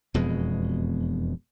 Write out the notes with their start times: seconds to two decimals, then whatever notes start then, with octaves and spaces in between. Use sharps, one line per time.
0.14 E1 F2 B2 G#3